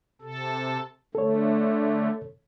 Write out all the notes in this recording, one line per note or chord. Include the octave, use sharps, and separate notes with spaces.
C3 A4
D3 A3 A4 C#5